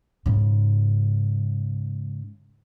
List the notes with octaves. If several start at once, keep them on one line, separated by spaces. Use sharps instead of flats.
G#2 C#3